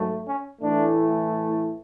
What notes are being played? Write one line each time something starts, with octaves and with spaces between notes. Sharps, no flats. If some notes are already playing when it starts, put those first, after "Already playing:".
Already playing: G#2 F#3 A3
C#4
A2 E3 A3 D4